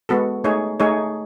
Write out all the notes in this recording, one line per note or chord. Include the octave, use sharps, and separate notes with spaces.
G#3 B3 F#4 A4
A3 D#4 G#4 C#5
A3 D#4 G#4 C#5